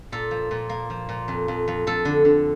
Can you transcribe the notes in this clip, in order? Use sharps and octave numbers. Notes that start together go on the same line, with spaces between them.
A#2 A4
F3
A#2
A#3
F3
A#2
F2
F2
F2
F2 A4
D3
D3